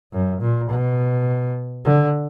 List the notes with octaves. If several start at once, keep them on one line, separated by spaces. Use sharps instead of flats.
F#2
A#2
B2
D3